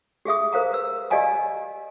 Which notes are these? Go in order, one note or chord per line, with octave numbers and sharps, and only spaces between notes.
G4 G#4 E5 D#6
A#4 C5 F5 A#5
B4 E6
G4 D5 D#5 F5 G#5 A#5